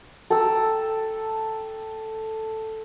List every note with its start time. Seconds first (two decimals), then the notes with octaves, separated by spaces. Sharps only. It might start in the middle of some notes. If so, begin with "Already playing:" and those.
0.30 A4 G5 A#5 E6